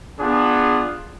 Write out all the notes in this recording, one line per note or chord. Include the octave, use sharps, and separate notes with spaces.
B3 D4 F4 G#4